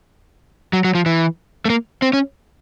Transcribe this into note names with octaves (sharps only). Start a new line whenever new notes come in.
F#3
F#3
F3
E3
A3
A#3
C4
C#4